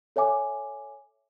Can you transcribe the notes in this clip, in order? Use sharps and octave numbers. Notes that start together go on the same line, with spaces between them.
A4 C#5 E5 G#5 D6